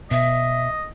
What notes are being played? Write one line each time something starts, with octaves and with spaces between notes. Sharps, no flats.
B2 D#5 E5